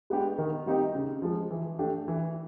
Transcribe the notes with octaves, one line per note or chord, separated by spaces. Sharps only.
G#3 B3 D4 G4
D#3
G3 C4 D#4 G4
C#3
F3 G#3
E3
A3 D4 G4
E3